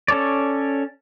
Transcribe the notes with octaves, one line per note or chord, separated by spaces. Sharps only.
C#4 A4 C#5 D5